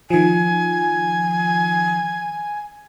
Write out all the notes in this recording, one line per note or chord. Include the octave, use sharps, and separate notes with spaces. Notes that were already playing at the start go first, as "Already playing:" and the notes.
D#3 F3 G#5